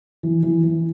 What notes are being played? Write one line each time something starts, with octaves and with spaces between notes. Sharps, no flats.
E3
E3
E3